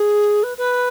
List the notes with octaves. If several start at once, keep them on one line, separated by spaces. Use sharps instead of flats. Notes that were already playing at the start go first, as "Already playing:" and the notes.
Already playing: G#4
B4
B4